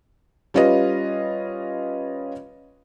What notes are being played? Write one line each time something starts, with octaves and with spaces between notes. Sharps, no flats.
G3 C#4 F4 B4 D#5